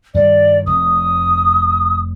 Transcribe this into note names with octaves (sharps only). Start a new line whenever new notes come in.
G2 D#3 G3 D5
F1 D#6